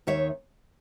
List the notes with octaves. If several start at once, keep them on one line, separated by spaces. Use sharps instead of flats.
D#2 D#3 C#5 E5